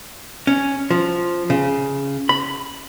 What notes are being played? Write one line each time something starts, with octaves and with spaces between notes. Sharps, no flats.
C#4
F3
C#3
B5